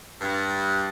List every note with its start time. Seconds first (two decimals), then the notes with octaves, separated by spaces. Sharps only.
0.21 G2